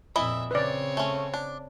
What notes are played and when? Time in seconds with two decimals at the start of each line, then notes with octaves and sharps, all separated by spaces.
0.16 F2 A#2 E3 E4 D#5 E5
0.51 C#3 C4 B4 C#5 D5
0.97 A3 C#4
1.34 D4